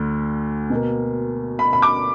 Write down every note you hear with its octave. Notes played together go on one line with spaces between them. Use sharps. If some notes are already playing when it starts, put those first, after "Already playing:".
Already playing: D2 D3
B2
A#3
B5
B5
D6